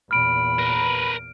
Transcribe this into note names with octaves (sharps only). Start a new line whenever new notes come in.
E2 A#2 B5 F6 D7
A#4 B4